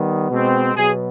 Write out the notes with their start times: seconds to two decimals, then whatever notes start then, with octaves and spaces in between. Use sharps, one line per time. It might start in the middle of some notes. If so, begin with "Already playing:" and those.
Already playing: D#3 G3 B3
0.31 B2 G#3 C4
0.76 B2 F#3 B3 G#4